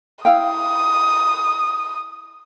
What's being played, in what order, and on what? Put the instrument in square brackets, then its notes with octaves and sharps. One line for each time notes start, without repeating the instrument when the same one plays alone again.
[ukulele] E4 F5 G5 [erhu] D#6